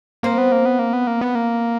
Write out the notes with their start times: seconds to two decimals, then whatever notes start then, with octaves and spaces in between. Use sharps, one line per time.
0.23 A#3 C4
0.38 B3
0.52 A#3
0.65 B3
0.79 A#3
0.93 B3
1.07 A#3
1.21 B3
1.35 A#3